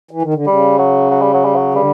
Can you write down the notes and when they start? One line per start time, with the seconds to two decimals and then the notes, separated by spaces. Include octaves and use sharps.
0.11 E3
0.22 D#3
0.34 D3
0.47 C#3 G3
0.79 F#3
1.11 F#3
1.22 G3
1.33 F#3
1.45 G3
1.56 F#3
1.74 D3 G3